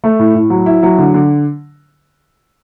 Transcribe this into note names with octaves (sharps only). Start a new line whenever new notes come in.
A3
A2
A2
F#3
E4
F#3
D3
D3